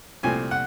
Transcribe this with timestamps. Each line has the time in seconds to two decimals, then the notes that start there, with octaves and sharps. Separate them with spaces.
0.23 C2 A#2 F3 A3 C4 G#5
0.51 F#5